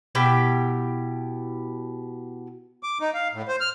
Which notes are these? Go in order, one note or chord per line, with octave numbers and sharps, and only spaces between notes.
B2 E4 G4 G5
D6
D#4
F5
A2
C5
F6